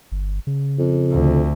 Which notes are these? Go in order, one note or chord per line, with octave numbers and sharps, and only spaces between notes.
G1
C#3
F2
D2